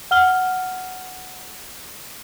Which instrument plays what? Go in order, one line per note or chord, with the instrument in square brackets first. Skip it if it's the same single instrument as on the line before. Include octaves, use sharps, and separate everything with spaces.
[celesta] F#5 F6 G7